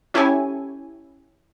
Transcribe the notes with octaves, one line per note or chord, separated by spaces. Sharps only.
C#4 E4 G4 A4 C#5 G#5